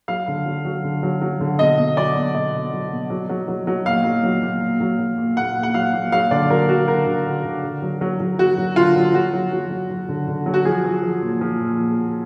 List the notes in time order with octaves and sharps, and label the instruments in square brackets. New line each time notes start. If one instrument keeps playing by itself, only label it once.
[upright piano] F#3 F5
D3
F#3
F#3
D3
F#3
F#3
D3
B2 D#5
B2
F#3 D5
B2
B2 D#5
B2
F#3
B2
F#3
F#3
F#3
F#3
A#2 F5
F#3
F#3
A#2
A#2
F#3
F#3
A#2
A#2 F#5
A#2
F#5
F#3 F5
A#2
F#3 F5
D3 D5
F#3 A#4
F#3 F#4
D3 A#4
D3
D3
D3
D3
F#3
F#3
F#3
F#3 F#4
F#3
D3 F4
F#3
F#3 F#4
F#3
F#3
F#3
F#3
D3
D3
F#3
F#4
F3 G#4
F3
F3
A#2
F3
A#2
A#2
A#2